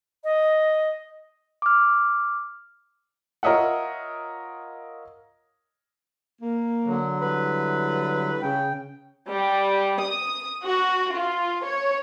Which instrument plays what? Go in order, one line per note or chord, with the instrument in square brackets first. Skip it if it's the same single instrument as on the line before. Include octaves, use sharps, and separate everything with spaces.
[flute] D#5
[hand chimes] D6 F6
[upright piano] F4 A#4 C#5 D#5 E5 F#5
[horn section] A#3
[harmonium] D3 F#3
[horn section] G3 E4 B4
[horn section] C#3 [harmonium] G5
[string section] G3
D#6
F#4
F4
C#5